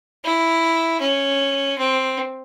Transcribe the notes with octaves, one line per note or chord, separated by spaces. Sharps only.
E4
C#4
C4